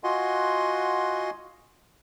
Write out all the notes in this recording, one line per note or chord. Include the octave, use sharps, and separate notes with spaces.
F4 F#4 D#5 F#5 G#5 C6